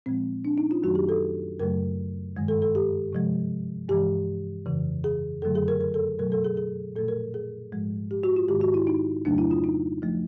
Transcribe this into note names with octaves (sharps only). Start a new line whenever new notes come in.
A#2 F3 G#3 C4
D4
D#4
F4
F#2 D#3 F#3 A3 F#4
G4
A4
F#2 C#3 F#3 A3 A#4
G2 D#3 G#3
A4
A4
G4
C3 F3 G#3
G2 E3 G#3 G4
F2 C#3 E3
G#4
F#2 D3 F#3 A3 A4
G#4
A#4
A#4
A4
B2 F#3 A3 A#4
A4
G#4
G#4
A#2 F3 A3 A4
A#4
G#4
G#2 F3 G#3
G4
F#4
F4
G#2 D#3 G#3 G4
F#4
E4
D#4
F2 C#3 F#3 A3 D4
E4
F4
D#4
F3 A3